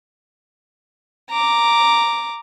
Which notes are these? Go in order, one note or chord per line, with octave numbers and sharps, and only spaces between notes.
A#5 D6